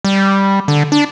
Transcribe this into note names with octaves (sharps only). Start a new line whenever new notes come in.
G3
D3
D4